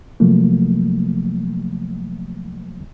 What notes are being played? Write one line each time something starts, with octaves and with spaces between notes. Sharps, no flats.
C3 F3 F#3 A3 A#3